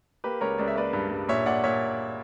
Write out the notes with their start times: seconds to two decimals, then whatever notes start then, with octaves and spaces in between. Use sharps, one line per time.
0.24 A#3 G4 B4
0.41 C#2 A#4 C#5
0.58 C#2 D5
0.68 E5
0.76 A#3 B4 D5
0.93 G2
1.11 G2
1.29 A#2 C#5 E5
1.46 A#2 D5 F#5
1.64 A#2 C#5 E5